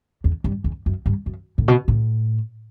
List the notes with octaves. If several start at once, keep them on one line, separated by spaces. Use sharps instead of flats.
E2
G2
E2
F#2
G2
F#2
A2
B2
A2